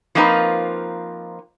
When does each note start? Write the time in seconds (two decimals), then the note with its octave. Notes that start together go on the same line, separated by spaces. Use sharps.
0.15 F3 A#3 C4 D#4 F4 B4